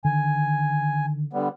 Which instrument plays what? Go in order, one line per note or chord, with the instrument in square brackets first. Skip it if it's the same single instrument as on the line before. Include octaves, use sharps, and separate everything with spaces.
[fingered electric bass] D3 D#3 [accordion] G#5
[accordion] D3 G3 B3